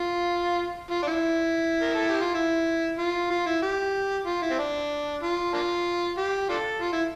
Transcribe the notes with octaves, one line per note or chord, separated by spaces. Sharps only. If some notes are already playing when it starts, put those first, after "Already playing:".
Already playing: F4
F4
D4
E4
A#4
A4
G4
F4
E4
F4
F4
E4
G4
F4
E4
C4
D4
F4
A#3 D4 F4
G4
D4 F4 A4
F4
E4